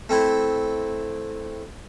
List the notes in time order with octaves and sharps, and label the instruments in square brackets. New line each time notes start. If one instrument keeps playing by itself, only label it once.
[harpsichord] A3 C4 E4